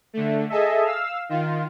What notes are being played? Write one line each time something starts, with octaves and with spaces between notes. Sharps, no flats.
D3 A3
G#4 A4 D#5 E5
F5 E6
D#3 F4